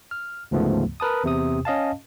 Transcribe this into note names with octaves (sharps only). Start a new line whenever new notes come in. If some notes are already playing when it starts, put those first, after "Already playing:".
F6
D2 G#2 C#3 F3 A3 B3
A#4 B4 A5 D#6
E2 C3 D#6
C#4 D#5 F5 A5